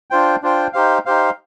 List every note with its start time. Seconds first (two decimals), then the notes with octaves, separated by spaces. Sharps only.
0.10 D4 F4 C5 G5
0.42 D4 F4 C5 G5
0.73 D#4 G4 C5 F5
1.06 D#4 G4 C5 F5